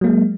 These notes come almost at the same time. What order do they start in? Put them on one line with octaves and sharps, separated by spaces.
F#3 A#3 G#3